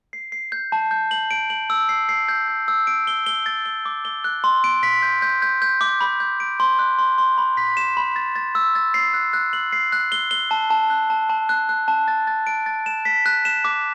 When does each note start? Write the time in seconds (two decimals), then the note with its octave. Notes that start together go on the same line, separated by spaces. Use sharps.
0.13 C7
0.32 C7
0.52 G6
0.72 A5
0.91 G6
1.11 F#7
1.31 D7
1.50 F#7
1.70 E6
1.89 C7
2.09 C7
2.28 G6
2.48 G6
2.68 E6
2.87 D7
3.07 G7
3.26 G7
3.46 A6
3.66 G7
3.86 D6
4.05 G7
4.24 F#6
4.44 C6
4.64 D7
4.83 B6
5.03 G6
5.22 G6
5.42 G6
5.62 G6
5.81 D6
6.01 B5
6.20 G6
6.40 D7
6.60 C6
6.79 F#6
6.99 C6
7.18 C6
7.38 B5
7.57 B6
7.77 E7
7.97 B5
8.16 A6
8.36 A6
8.55 E6
8.75 A6
8.94 C7
9.14 F#6
9.33 F#6
9.53 F#7
9.73 C7
9.92 F#6
10.12 G7
10.31 G7
10.51 A5
10.70 A5
10.90 F#6
11.10 A5
11.30 A5
11.49 F#6
11.69 F#6
11.88 A5
12.08 A6
12.27 A6
12.47 D7
12.66 A6
12.86 E7
13.05 B6
13.26 F#6
13.45 E7
13.65 D6